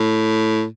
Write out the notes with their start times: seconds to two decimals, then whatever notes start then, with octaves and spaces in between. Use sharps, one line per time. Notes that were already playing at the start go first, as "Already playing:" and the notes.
Already playing: A2